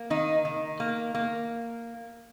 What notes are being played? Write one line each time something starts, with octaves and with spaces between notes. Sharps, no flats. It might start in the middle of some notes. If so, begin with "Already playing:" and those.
Already playing: A#3
D#3 D#4
D#3
A#3
A#3